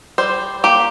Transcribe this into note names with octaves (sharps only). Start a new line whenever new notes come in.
G3 C5
A#3 G4